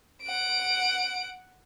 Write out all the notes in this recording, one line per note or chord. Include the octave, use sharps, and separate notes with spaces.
F#5 D7